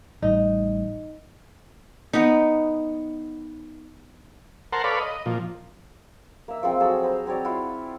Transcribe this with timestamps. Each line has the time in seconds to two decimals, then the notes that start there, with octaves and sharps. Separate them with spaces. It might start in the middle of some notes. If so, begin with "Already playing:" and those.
0.22 A1 G3 D#4
2.13 B3 D#4
4.73 A#4 C5 F#5 A5 A#5 C6
4.84 A4 B4 C#5 D5 F5 B5
4.99 D#5
5.26 A#2 F3
6.48 A#3 E5
6.63 F3 G#3 C4
6.80 F#3 G#4 A4 E6
7.03 C5 A#5 B5
7.26 F#3 C4 C#5 D5
7.45 E4 F4 F#5